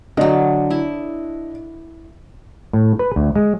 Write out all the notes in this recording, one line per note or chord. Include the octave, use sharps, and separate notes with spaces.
D3 F#3 D4 D#5
E4
A2
B4
D2
G#3